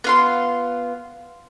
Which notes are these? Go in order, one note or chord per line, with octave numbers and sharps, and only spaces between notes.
B3 F4 C6